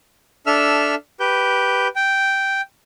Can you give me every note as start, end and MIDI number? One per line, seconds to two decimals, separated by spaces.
0.46 0.95 62
0.46 0.95 69
0.46 0.95 76
0.46 0.95 88
0.46 0.95 89
1.20 1.88 67
1.20 1.88 71
1.20 1.88 91
1.96 2.61 79